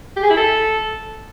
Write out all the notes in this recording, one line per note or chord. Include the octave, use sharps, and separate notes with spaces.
G4
G#4
E4
A4